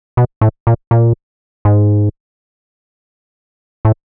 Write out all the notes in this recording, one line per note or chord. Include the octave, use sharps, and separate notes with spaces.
B2
A2
A#2
A#2
G#2
A2